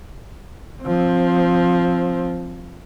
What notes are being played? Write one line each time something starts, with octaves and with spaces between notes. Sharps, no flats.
F3 C4